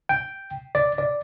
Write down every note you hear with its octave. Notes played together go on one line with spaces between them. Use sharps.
G5
D5
D5